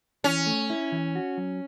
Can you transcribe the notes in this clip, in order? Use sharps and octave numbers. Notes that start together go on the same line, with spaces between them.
E3 C#4
A3
E4
E3
F#4
F#3